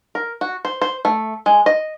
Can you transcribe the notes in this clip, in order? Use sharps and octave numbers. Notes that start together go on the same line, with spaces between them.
A#4
F#4
C5
C5
A3
G#3
D#5